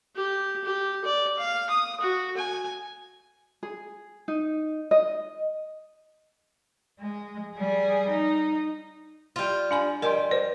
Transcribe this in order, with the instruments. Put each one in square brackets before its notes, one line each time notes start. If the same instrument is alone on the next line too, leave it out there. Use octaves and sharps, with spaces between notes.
[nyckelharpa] G4
G4
D5
F5
D#6
F#4
G#5
[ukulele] G#4
D#4
D#5
[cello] G#3
G3 G#4
D#4
[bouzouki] G3 F4
[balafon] D4 G#5 B5 [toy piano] F5
[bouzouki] G3 [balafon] A#4 [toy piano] D#5 G#5 C6
[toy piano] B4 [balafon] C5